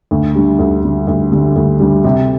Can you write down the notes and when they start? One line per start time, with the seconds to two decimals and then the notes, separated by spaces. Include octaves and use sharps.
0.11 D2
0.35 D3 G3
0.59 D2
0.83 D3 G3
1.07 D2
1.32 D3 G3
1.56 D2
1.80 D3 G3
2.04 C3